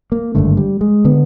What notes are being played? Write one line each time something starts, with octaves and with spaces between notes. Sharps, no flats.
A#3
G#1 G2 D3 A3
G3
G#3
D3 B3